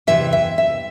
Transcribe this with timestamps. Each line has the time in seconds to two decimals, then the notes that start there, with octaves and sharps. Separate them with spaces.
0.07 E2 C3 E3 E5
0.33 E5
0.58 E5